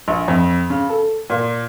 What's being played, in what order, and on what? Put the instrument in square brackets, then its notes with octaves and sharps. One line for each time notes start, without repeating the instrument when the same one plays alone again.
[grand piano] A#1
F2
C#3
A4
A#2